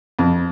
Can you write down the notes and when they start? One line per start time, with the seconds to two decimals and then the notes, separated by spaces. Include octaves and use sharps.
0.19 F2